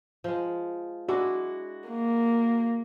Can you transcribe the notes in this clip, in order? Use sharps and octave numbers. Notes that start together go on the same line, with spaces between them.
F3 G#3
G#3 D4 E4 F#4
A#3